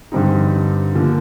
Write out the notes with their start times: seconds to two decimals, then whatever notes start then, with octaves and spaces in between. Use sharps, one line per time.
0.12 G2 D3 G3 C4 D#4
0.95 D3 F3 A#3